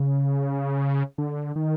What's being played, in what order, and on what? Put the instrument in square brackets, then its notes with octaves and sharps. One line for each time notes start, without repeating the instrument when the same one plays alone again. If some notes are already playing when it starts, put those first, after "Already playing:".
Already playing: [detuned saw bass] C#3
D3
D#3